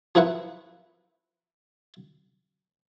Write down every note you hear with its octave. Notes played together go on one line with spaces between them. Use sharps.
F3 C4 E4 A#4 B4 F#5